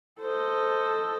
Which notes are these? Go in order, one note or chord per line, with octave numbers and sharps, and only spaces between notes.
A4 C5 D#5